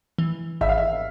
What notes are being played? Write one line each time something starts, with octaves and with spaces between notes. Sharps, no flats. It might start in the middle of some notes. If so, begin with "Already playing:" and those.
E3
G#1 E5
F5
E5